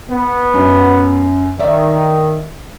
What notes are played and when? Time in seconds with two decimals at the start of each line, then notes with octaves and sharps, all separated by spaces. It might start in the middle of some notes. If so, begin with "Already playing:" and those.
0.10 B3
0.54 F#2
1.59 D#3 D5 E5